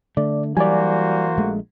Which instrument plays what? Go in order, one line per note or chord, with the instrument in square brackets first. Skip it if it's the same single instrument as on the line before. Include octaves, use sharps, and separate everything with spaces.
[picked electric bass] D3 [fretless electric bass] A3 [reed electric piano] D5
[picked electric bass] E3 F#3 [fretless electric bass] G3 [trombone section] A#3 F#4 C5 [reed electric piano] D5 G#5
[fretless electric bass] A#1 G#3 A3